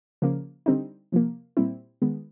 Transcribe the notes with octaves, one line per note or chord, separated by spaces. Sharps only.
C#3 F3 A#3
D3 G3 C4 D#4
C3 F3 A#3
A#2 G3 C4 E4
D#3 G#3 B3